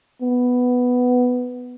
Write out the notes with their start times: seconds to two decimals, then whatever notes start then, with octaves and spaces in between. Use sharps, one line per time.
0.22 B3